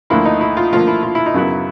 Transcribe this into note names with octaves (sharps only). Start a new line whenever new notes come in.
D2 D3 F3 A#3 E4
D#4
E4
F4
D2 D3 F3 A#3 F4
E4
F4
E4
D#4
F#2 C#3 F#3 B3 E4